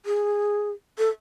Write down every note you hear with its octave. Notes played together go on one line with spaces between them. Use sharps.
G#4
A4